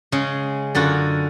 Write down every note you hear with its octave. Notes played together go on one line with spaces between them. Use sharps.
C#3 G#3
F#2 D3 F4 F#4